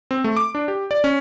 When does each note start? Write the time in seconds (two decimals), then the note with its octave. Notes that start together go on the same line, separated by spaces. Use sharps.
0.11 C4
0.24 A3
0.37 D6
0.55 D4
0.68 G4
0.91 D5
1.04 C#4